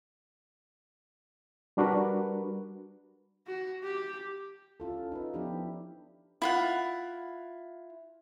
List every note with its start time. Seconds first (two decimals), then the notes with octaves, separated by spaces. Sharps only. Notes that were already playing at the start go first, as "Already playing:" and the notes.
1.77 G3 D4 F#4 A#4 B4
3.47 F#4
3.83 G4
4.80 C#4 E4 F4 A4
5.12 D#4 F4 B4
5.34 F3 B3 D4 E4 G4
6.42 E4 F4 F#5